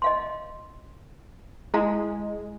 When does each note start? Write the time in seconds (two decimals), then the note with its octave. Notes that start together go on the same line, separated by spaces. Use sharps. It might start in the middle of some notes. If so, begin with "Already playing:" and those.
0.02 D#5 F5 C6
1.74 G#3 E4 F5 A#5